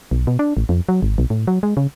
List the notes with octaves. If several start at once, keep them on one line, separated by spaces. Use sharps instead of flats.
B1
B2
D4
A1
F2
F#3
G#1
B1
A2
F#3
G#3
C#3